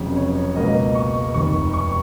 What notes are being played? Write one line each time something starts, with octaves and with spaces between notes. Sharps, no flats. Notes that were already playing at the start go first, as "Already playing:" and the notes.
Already playing: F1 F2 C#3 F#3 C#5
C#5
C#2 B2 A#3 D#5
C#6
F1 D#2 D#3 C#6
C#6